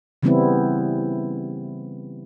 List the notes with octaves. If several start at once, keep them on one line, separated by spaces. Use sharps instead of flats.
C#3 E3 G3 B3 C4 E4